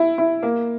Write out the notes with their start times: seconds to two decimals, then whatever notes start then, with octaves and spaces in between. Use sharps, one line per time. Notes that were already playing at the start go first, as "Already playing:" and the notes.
Already playing: E4
0.18 E4
0.43 A#3